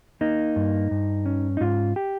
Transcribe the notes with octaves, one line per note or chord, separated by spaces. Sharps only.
A#3 D#4
G2
G2
C#4
D#4
G#2 F4
G4